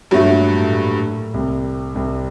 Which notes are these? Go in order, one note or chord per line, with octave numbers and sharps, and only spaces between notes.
G2 A#2 F#3 A3
A#2
A2
A#2
C2 C3
C2 C3